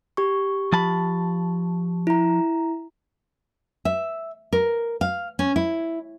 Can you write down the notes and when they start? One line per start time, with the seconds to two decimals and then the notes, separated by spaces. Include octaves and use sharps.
0.17 G4 C#6
0.73 F3 A5 B5
2.07 E4 A#5
3.85 E5
4.53 A#4
5.01 F5
5.39 C#4
5.56 E4